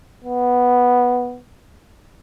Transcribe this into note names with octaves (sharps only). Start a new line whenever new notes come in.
B3